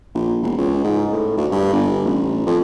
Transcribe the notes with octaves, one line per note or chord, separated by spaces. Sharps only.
A#1
E1
C#2
G#2
A2
D2
G2
G1
A1
F2